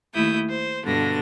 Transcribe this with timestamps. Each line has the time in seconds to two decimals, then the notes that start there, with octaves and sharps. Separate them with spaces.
0.13 D#2 A3 E4 D#6 G6
0.48 C5
0.83 G2 B2 D3 A#6